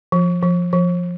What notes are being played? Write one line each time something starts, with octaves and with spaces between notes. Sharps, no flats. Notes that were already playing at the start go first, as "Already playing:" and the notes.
F3
F3
F3